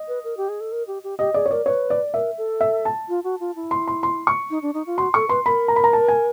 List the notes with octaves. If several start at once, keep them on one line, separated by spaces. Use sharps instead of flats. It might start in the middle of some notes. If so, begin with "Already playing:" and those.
Already playing: D#5
B4
A#4
G4
G#4
A4
A#4
G4
G4
G4 D#5
G#4 D5
C#5
A#4 D5
B4 C#5
D5
A#4 E5
A4
E5
A5
F4
F#4
F4
E4
C6
C6
C6
C#6
D#4
D4
D#4
F4
F#4 C6
A4 C#6
B4 C6
A#4 B5
A#5
B5
A#5
A5
G#5